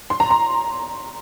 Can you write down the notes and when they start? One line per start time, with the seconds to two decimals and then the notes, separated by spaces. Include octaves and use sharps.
0.10 C6
0.20 A#5
0.31 C6